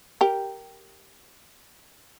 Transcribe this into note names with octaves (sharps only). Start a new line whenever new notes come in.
G4 A#4